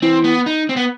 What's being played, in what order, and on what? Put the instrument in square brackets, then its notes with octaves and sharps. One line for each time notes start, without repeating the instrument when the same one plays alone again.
[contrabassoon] E3 [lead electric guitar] C4
[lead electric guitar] B3
D#4
C4
B3